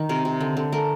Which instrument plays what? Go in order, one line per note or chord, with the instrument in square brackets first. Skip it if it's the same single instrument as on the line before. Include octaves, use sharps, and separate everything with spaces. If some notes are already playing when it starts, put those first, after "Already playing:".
Already playing: [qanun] D#3
C3 A#4
C3
D3
D3
A3 A#4